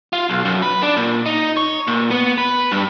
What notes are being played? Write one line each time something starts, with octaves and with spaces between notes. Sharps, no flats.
F4
B1
F#2
B4
D4
A#2
D#4
C#5
A#2
B3
B4
G2